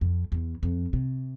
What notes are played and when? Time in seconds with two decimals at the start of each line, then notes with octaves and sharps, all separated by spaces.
0.01 F2
0.32 E2
0.63 F2
0.93 C3